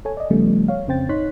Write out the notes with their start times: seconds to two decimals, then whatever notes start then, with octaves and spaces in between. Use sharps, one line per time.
0.05 A4 C#5 G#5
0.17 D5 D#5
0.30 C#3 F3 G3 A3 B3
0.68 C#5 F5
0.87 F2 C#3 C4 C5 G5 A6
1.09 G#1 D#4 C#5 C6 F#6 B6